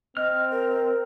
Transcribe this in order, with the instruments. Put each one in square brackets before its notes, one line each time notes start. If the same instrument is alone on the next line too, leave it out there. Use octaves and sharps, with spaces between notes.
[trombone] C4 [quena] D#5 [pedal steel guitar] F6
[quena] A#4